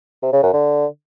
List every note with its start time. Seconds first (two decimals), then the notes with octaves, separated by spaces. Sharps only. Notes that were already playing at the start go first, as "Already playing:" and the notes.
0.22 C3
0.33 C#3
0.43 F#2
0.53 D3